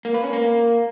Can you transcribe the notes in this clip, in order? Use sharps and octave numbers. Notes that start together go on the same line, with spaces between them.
A#3
B4
C#4
A#3